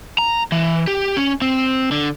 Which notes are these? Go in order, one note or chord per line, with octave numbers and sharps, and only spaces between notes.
A#5
E3
G4
C#4
C4
D3